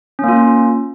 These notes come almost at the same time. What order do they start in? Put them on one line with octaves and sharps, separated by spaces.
C#4 A#3 F4